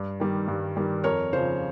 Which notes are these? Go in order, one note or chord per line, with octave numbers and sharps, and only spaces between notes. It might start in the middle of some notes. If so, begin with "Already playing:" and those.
Already playing: G2
D#3 G3
G2
D#3 G3
F2 A#4 C#5
C#3 F3 C5